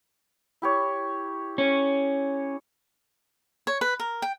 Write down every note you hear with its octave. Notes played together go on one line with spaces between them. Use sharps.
E4 G4 C#5
C#4
C#5
B4
A#4
G5